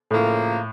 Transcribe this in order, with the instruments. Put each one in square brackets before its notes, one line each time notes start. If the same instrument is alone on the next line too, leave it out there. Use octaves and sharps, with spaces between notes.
[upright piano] A2 [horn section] C#3 F3 A#3